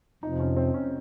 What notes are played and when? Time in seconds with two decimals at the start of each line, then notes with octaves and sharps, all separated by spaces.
0.23 F2 C3 F3 D#4
0.40 C#4
0.57 C4
0.74 C#4